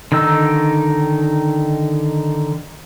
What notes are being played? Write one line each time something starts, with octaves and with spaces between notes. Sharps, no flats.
D3 D#3 D#4 E6